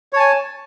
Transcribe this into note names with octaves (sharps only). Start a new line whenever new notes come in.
C#5 G#5 A5